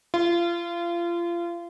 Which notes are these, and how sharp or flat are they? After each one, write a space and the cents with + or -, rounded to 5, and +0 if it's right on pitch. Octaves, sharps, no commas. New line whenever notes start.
F4 -30